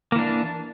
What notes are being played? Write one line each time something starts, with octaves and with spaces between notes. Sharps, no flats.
E3 A#3 D4